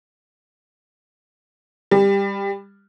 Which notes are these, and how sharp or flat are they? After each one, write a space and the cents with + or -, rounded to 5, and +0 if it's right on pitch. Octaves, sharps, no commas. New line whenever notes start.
G3 +20